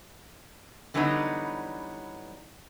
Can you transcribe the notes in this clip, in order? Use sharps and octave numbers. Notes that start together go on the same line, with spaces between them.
D3 E3 F#3 G3 B3 D#4